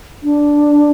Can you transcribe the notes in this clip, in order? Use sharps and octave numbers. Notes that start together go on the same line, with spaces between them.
D4